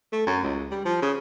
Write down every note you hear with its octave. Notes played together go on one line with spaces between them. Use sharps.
A3
F#2
C#2
G3
F3
C#3